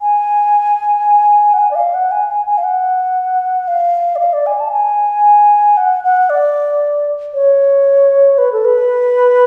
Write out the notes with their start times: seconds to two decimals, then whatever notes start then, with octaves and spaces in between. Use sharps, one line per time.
0.02 G#5
1.53 F#5
1.59 G#5
1.71 D5
1.75 F5
1.94 F#5
2.12 G#5
2.29 G#5
2.46 G#5
2.58 F5
2.64 F#5
3.68 F5
4.16 D5
4.20 F5
4.33 D5
4.46 G#5
4.60 A5
4.72 G#5
5.77 F#5
6.04 F#5
6.30 D5
7.34 C#5
8.38 B4
8.52 A4
8.65 B4